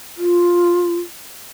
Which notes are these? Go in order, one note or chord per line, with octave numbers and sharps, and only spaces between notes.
F4